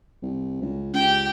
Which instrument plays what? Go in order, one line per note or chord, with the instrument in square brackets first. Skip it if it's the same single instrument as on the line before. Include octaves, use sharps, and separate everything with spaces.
[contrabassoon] C2
C#2
[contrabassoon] C#2 [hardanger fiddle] G4 G5